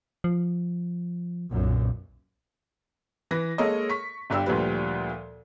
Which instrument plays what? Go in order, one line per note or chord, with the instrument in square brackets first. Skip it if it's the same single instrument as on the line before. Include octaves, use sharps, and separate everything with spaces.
[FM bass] F3
[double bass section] B1 F#2 A#2
[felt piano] E3 B4 A#6
G#3 A#3 A4 C#5 D#5
C#6 B6
G1 G2 G4 E6
D2 A#2 F3 G3 B4